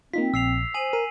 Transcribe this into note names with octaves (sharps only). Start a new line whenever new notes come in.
A#3 C4 D#4 F4 B6
A#1 E6 C7 F7
C5 G#5 D#6 D#7 F#7
A#4 D#7